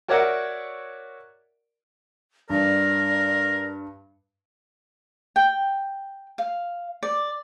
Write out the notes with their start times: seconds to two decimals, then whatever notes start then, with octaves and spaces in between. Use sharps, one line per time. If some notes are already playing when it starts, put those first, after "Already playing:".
0.08 F#4 A#4 C#5 D5 E5 F#5
2.50 G2 A#4 D5
5.36 G5
6.38 F5
7.03 D5